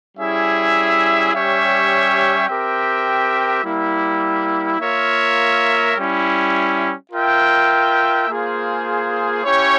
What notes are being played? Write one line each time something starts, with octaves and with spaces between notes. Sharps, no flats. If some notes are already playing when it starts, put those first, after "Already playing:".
G3 C#4 E4 G#4 E5
G3 C#4 G4 C#5 E5
C4 G4 A#4 E5 G5
G3 A#3 E4
A#3 F4 A#4 C#5 E5
G3 C#4 E4
F4 A#4 E5 G5
A#3 F4 G#4 C5
C#4 E4 G4 C#5